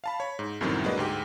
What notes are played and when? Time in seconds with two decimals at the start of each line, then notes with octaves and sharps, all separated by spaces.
0.04 F5 A5 B5
0.20 C#5 B5
0.39 G#2
0.61 C2 F#2 A2 C3 D#3 F#3
0.84 F#3 G#3 A#3 D4 B4 D#5
0.97 D2 G#2 G4